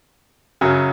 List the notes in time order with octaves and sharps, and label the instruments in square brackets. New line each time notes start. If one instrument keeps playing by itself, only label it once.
[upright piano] F#2 C#3 F#3 C#4